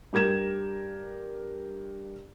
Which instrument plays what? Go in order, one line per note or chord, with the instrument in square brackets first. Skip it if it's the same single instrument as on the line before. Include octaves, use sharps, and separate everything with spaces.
[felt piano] G2 G4 A#4 G#6 E7